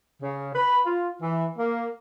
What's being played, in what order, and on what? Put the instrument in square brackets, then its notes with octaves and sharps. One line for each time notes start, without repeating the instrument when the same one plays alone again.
[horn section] C#3
B4
F4
E3
A#3